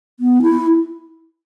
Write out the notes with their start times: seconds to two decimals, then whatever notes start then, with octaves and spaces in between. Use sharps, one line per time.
0.20 B3
0.42 E4